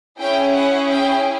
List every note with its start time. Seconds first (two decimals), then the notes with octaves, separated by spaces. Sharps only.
0.19 C#4 E4 G#4 G5
0.55 F#5
0.90 G5